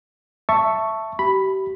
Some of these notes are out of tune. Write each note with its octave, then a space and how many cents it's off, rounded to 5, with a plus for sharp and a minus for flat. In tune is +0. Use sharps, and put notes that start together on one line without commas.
E5 +5 A5 +10 C#6 +0
G4 -35 B5 +0